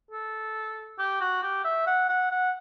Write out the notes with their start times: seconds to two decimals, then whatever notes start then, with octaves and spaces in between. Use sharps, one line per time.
0.11 A4
0.99 G4
1.21 F#4
1.43 G4
1.65 E5
1.87 F#5
2.09 F#5
2.31 F#5